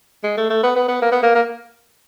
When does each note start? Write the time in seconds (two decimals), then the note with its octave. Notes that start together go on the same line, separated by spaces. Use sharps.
0.24 G#3
0.37 A3
0.50 A3
0.63 B3
0.76 B3
0.88 B3
1.02 A#3
1.12 B3
1.23 A#3
1.35 A#3